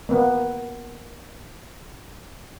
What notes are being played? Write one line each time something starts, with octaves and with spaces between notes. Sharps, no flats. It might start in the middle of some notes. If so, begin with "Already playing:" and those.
A#3 B3